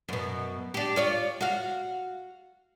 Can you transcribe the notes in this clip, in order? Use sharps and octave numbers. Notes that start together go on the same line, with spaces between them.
F#2 B2
D4 G4
F4 C#5 D5
F#4 F5